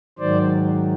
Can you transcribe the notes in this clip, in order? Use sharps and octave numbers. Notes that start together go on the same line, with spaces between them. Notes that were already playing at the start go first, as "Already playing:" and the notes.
G#2 D#3 F#3 C5 D5